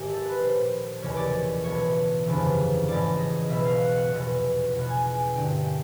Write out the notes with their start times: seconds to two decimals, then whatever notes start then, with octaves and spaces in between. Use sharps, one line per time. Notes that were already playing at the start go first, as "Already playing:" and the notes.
Already playing: G#1 G#2 D#3 G4
0.10 A4
0.25 B4
0.40 A#1 A#2 C5
1.02 F1 D#2 C#3 E3 C#5
1.16 D5
1.30 C#5
1.64 B1 A2 E3 C#5
2.25 G1 F2 C#3 E3
2.88 A1 G#2 E3 D5
3.19 D#5
3.49 B1 B2 E5
3.65 F5
3.81 F#5
3.96 F#5
4.12 F1 E2 B2
4.73 C#2 B2 F#5
4.89 G#5
5.04 G#5
5.19 G5
5.35 G#1 G2 D3 G5
5.66 G5